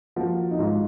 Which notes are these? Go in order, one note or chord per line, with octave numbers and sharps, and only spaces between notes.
F3 A#3 F#4
D#4
G#2 F4